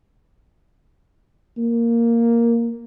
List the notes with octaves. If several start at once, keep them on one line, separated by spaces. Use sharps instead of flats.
A#3